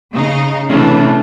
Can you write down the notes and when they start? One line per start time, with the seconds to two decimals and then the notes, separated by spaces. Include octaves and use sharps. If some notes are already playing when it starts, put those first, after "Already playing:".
0.12 C#3 D#4
0.70 C3 E3 A3 C#4 D4